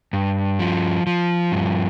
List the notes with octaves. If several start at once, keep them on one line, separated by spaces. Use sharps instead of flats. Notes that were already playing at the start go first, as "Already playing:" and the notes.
G2
F3
F3
G2